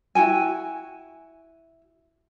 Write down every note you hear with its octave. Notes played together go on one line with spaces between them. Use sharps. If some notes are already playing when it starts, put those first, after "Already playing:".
E4 F#4 G5 G#5